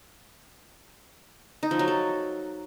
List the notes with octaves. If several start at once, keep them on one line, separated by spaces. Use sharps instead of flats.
D#4
F3
F#3
A4